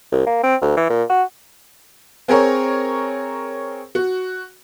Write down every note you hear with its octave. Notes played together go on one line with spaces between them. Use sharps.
C2
A#3
C4
D2
E3
A#2
F#4
C4 G#4 A#4 C#5
F#4